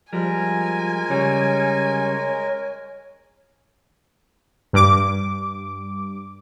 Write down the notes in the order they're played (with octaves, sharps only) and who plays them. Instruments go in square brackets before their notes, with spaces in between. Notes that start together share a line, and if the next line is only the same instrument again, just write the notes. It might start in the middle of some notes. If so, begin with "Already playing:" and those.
[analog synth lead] F3 [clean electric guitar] G3 [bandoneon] G#3 A#4 [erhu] G#5
[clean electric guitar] C#3 G3 [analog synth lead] C#5
[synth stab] G2 D6